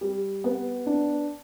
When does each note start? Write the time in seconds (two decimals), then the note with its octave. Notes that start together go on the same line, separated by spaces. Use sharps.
0.01 G3
0.44 B3
0.86 D4